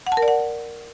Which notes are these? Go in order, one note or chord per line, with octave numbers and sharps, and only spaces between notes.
F#5
A5
A#4
D5
F#5